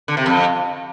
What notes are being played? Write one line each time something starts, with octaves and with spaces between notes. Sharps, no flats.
D3
C3
F2